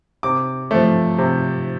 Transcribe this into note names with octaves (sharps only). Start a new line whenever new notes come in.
C3 D6
F3 A3
C3